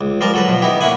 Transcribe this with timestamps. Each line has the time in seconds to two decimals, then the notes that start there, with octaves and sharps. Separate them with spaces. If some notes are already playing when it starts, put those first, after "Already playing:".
0.01 C#2
0.21 F3 G3 A#4 A5
0.34 F#3 A4 B4
0.48 B2 F3
0.62 B3 D#4 E4 G4
0.81 A#3 C#4 E4 E5 F#5 G#5